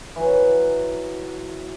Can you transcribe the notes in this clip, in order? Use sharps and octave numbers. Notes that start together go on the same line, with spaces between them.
E3 F#3